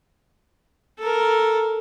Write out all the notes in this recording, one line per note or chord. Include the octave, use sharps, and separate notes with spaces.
A4 A#4